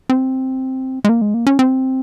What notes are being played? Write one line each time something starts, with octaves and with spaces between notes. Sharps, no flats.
C4
G#3
A#3
G#3
A#3
C#4
C4